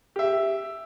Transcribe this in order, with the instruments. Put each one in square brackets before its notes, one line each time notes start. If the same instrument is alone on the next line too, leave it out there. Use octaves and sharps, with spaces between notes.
[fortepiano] G4 E5